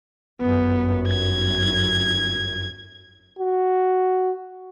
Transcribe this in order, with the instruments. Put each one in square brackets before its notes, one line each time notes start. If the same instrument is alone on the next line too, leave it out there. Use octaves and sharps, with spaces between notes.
[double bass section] G1 F#2 [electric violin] B3
[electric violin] G#6
[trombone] F#4